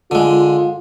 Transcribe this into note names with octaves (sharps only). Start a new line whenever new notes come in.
D3 G#3 F4